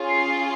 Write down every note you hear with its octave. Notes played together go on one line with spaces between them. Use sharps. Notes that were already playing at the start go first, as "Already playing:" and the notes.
Already playing: C#4 F4 G#4
C7